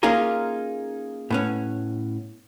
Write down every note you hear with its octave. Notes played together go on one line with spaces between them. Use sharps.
A#3 C#4 D#4 F4 G#4 A#4
A2 B3 C#4